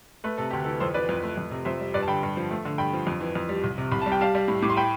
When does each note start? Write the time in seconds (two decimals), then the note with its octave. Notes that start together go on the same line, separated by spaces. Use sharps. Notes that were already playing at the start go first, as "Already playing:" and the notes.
0.24 A3 B4
0.38 C3 A4
0.51 D2 G4
0.64 E3 A4
0.80 F2 A4 C5
0.94 E3 B4 D5
1.09 F2
1.23 A3
1.37 F2
1.51 C3
1.65 F2 C5 E5
1.80 G3
1.94 G2 B4 D5
2.02 A5
2.08 D3 G5 B5
2.23 G2
2.37 F3
2.51 A3
2.65 D3
2.78 G2 G5 B5
2.93 F3
3.07 F2
3.21 E3
3.35 F2
3.49 G3
3.64 C2
3.78 C3
3.92 C2 B5
4.02 G3 A5
4.12 G5
4.21 G3 F5 A5
4.35 G3
4.48 A2
4.62 A2 D6
4.70 C6
4.77 G5 B5